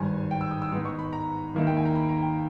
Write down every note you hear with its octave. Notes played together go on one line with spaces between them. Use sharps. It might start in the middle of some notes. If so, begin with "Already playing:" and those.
Already playing: G#1 G2 D#3 G#5
G5
E6
D#6
E6
G#2 D#3 G#3 B3 D#4
C#6
B5
A#5
D#2 D#3 A#3 D#4 E5
G5
G#5
A#5
B5
A#5
G5